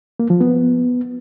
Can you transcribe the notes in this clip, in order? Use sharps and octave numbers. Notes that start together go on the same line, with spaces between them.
A#3
F3
B3